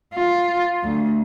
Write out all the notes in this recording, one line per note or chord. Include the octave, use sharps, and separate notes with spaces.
F4
D2